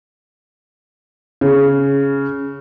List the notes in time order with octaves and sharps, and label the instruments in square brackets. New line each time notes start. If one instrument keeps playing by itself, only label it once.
[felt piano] C#3